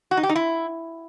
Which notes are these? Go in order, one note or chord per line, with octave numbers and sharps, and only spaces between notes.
F#4
D#4
G4
D#4
E4